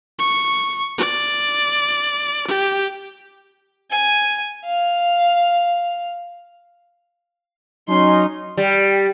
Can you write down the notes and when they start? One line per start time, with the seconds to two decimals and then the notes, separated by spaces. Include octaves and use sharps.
0.19 C#6
0.98 D5
2.47 G4
3.91 G#5
4.65 F5
7.88 F#3 C#4 D#4 C6
8.57 G3